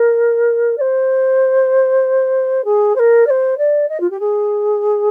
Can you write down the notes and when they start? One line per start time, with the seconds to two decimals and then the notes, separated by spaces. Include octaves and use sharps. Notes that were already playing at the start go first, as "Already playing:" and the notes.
Already playing: A#4
0.77 D5
0.81 C5
2.64 G#4
2.95 C5
2.99 A#4
3.26 D5
3.30 C5
3.57 D5
3.88 D#5
4.00 F4
4.10 G4
4.20 G#4